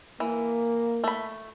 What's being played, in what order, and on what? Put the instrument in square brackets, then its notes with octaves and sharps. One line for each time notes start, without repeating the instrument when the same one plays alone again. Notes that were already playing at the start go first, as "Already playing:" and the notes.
[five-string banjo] E3 [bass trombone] A#3
[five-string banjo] A3 B5